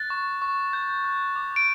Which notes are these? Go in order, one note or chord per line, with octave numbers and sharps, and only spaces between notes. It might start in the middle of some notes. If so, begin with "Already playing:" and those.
Already playing: F#6 A6
C#6
C#6
G6
F#6
D6
D7